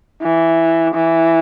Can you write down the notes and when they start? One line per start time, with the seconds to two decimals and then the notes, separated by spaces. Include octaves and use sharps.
0.23 E3
0.94 E3